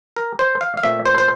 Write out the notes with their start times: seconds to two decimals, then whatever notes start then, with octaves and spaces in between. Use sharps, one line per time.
0.16 A#4
0.39 C5
0.61 F5
0.77 F5
0.83 A#2 A3 C4 E5
1.06 C5
1.18 C5